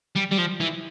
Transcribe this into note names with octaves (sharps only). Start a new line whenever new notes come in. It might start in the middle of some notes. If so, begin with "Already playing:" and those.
G3
G3
F3
E3